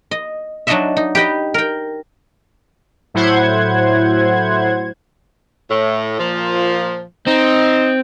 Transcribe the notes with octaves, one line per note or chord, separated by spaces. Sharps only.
D#5
F#3 D4 D#4 F#4 D#5 E5
D#4
G4 B4 D#5 G5
A#4 G5
A2 F#3 E4 C5 F#5 G#6
A2
A#2 F3
C4 D#4